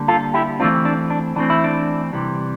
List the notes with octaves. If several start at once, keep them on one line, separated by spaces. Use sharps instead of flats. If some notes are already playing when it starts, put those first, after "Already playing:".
Already playing: D3 G3 A#3
F4 A4
E4 G4
E3 A3 C4 D4 F4
D4
D4
E3 A3 C4 D4
E4
D4
C3 E3 G3